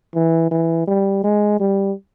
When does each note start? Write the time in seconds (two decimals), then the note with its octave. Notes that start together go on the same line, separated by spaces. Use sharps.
0.14 E3
0.51 E3
0.87 G3
1.24 G#3
1.60 G3